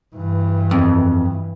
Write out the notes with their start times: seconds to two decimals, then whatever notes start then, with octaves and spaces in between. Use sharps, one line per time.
0.15 G2 E3
0.71 F2